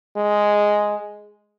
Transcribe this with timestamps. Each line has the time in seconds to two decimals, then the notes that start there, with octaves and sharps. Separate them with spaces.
0.17 G#3